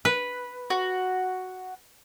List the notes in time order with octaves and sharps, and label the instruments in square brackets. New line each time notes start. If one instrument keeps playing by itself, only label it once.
[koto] B4
[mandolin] F#4